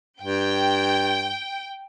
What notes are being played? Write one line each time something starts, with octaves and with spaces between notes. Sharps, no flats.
G2 G5